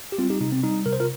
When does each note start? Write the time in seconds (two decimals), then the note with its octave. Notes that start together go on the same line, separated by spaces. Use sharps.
0.12 G4
0.18 G3 C4 F4
0.30 D#4 G4
0.41 C3 D#4
0.52 C4
0.63 G3 D#4
0.86 C3 A#4
0.93 C5
1.00 F4 A#4